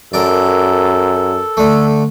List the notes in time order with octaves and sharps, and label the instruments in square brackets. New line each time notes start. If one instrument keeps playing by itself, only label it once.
[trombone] F#2 [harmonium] A4 [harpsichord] A#4 D5
[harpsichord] D3 A3